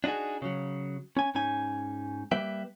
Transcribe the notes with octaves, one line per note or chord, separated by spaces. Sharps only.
D4 D#4 F4 F#4 G#4
C#3 F#3
C#4 G#5
G#2 C#4 D#4 G#5
G3 A#3 B4 E5 G5